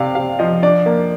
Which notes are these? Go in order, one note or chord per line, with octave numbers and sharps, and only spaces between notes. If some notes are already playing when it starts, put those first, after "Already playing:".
Already playing: C3 C4 D5 F5
C3 F5
F3 D#5
D4 D5
A#3